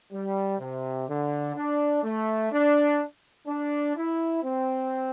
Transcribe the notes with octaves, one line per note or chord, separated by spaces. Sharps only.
G3
C3
D3
D4
A3
D4
D4
E4
C4